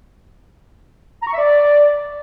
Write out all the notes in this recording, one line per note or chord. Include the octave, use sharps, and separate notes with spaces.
A#5
C#6
E5
D5